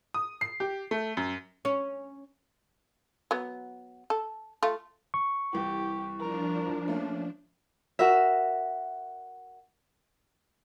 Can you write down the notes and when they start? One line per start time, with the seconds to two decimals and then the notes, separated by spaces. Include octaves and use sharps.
0.14 D#6
0.41 C7
0.60 G4
0.91 A3
1.17 F#2
1.65 C#4
3.31 F#3 B3
4.10 A4
4.63 A3 F4
5.14 C#6
5.53 C2 E3 G4
6.19 F3 D4 A#4
6.88 A3 A#3 C#4
7.99 F#4 A#4 E5